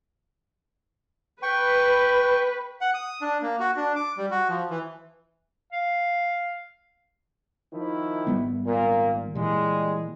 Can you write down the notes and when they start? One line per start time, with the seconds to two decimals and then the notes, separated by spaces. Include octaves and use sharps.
1.42 B4 G5 C#6
2.81 F#5
2.94 D#6
3.21 D4
3.42 A#3
3.60 F#4
3.77 D4
3.96 D6
4.17 G3
4.31 F#4
4.49 F3
4.70 E3
5.73 F5
7.73 D#3 F3 E4
8.27 G#1 G3 B3
8.66 A#2 A#3
9.35 A#2 E3 G3 G#3